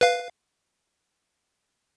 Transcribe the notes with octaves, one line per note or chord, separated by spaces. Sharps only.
B4 F5